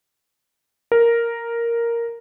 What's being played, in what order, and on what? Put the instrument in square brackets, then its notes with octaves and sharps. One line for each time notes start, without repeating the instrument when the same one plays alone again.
[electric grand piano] A#4